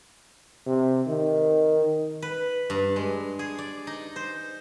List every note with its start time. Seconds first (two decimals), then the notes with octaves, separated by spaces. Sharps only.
0.66 C3
1.07 D#3
2.22 B4
2.70 G2
2.96 G#3
3.39 G#4
3.58 D5
3.87 D#4
4.16 C5